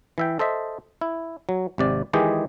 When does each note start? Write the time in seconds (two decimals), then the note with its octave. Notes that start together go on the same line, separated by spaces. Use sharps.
0.18 E3 E5 G5
0.39 A4 C5 D#5 E5
1.01 E4
1.49 F#3
1.78 G#1 C3 D5
2.13 D#3 E3 G#3 G4 G#4